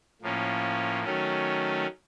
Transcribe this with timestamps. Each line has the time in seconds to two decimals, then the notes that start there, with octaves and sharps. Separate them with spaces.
0.22 A2 F3 A#3 C#4
1.04 D#3 F#3 A3 C#4